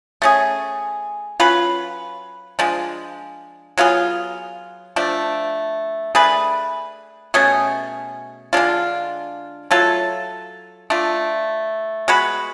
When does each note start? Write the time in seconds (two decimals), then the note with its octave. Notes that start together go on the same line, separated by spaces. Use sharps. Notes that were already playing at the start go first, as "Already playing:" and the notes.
0.22 A3 C#4 G#4
1.40 F#3 C#4 F4 B4
2.59 F3 G#3 D4
3.78 F#3 B3 F4 G#4
4.96 F3 A3 D4
6.15 A3 D4 G#4 B4
7.34 B2 A3 C#4 G#4
8.53 D3 G#3 D4 F4
9.71 F#3 A3 F4 A4
10.90 A3 D4 F4
12.08 G#3 B3 F#4 B4